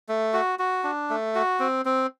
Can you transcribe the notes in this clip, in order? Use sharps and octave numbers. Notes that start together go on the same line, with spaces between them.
A3
F#4
F#4
D4
A3
F#4
C4
C4